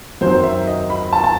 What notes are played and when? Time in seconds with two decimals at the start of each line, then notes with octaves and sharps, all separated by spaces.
0.21 F#2 D#3 F#3 C4 C5
0.44 E5
0.67 D#5
0.90 B5
1.13 A5
1.24 A5